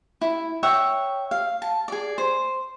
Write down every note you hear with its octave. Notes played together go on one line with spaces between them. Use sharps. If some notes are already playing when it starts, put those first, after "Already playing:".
E4
C#5 E5 F#5 G5
F5
A5
G#4 D5
C5